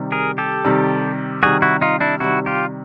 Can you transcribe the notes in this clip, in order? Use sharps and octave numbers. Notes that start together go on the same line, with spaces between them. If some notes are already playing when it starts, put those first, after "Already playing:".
Already playing: C3 D#3 G3
G#4 A#4
G4 A4
C3 D#3 G3
C3 D#3 G3 F#4 G#4
E4 F#4
D#4 F4
D4 E4
C3 D#3 G3 E4 F#4
F4 G4